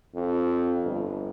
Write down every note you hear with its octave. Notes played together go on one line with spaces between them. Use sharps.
F2
G1